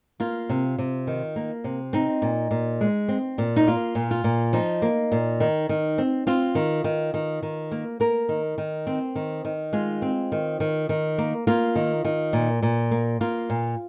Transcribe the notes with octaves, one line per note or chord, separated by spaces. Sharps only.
A#3 F4
C3
C3
D#3
A#3
C3
C4 D#4
A#2
A#2
G#3
C4
A#2
D#4
A#3 F4
A#2
F4
A#2
F3 D#4
A#3
A#2
D#3
D#3
C4
C4 F4
D#3
D#3
D#3
D#3
A#3
A#3 A#4
D#3
D#3
C4
D#3
D#3
G#3 F4
C4
D#3
D#3
D#3
A#3
A#3 F4
D#3
D#3
A#2
A#2
A#3
A#3 F4
A#2